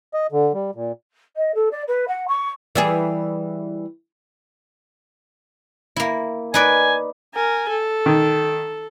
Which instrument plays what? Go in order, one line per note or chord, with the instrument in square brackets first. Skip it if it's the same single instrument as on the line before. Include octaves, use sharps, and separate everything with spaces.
[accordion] D#5
D3
G3
A#2
[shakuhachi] D#5
A4
D5
B4
F#5
C#6
[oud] E3 G3 G#4
[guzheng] A#3 E4
[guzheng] D#4 B4 D5 [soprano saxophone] G#5
[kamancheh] A#4 G#5
A4
[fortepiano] D#3